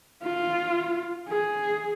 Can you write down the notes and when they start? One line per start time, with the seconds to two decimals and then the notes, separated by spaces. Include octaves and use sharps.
0.23 F4
1.28 G#4